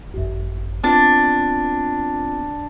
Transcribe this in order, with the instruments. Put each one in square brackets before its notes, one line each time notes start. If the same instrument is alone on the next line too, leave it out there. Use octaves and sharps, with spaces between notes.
[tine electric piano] G#1 F#2
[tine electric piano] B3 C4 F4 [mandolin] D4